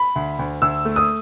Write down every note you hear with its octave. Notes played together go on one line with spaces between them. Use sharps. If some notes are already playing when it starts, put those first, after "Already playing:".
Already playing: B5
D2
D2
D2 E6
A3
D#6